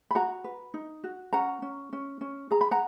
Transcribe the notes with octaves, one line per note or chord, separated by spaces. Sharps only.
B5
F#4 F#5 A#5
B4
D#4
F#4
C#4 F#5 A#5
C#4
C#4
C#4
G#4 A#5
B5
F#5 A#5